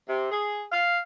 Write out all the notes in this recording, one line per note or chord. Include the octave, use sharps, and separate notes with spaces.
C3
G#4
F5